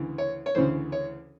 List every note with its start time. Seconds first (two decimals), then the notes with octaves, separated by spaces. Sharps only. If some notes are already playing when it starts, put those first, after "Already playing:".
Already playing: D2 C#3 E3
0.18 C#5
0.46 C#5
0.55 D2 C#3 E3 C5
0.92 C#5